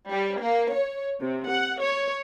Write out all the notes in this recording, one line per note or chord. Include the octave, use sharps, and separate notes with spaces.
G3
A#3
C#5
C3
F#5
C#5